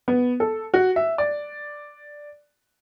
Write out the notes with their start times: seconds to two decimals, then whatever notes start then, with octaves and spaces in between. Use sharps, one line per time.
0.08 B3
0.40 A4
0.74 F#4
0.96 E5
1.18 D5